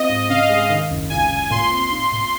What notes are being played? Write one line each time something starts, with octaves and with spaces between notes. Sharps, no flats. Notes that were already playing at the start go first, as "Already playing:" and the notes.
Already playing: C4 F4 D#5
G#2
C#3 F5
G#3
D#3
F#1
C#2 G#5
C#2
A#2 C6
C4
D#4
A#2